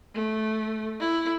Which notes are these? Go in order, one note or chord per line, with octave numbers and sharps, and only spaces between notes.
A3
E4